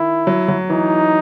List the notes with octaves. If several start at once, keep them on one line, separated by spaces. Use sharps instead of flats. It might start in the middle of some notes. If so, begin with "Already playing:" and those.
Already playing: D#3 E4
F#3
F#3
E3 D#4